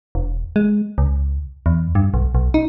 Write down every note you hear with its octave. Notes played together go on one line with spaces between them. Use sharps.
E1
G#3
C#2
E2
G2
B1
B1
D#4